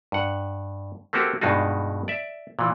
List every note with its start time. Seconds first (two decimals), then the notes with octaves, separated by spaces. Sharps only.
0.12 G2 F#5
1.13 A3 A#3 C4 F#4 G4
1.42 G2 B2 G#3 D#4 F4 F#4
2.08 D5 E5
2.59 A#2 E3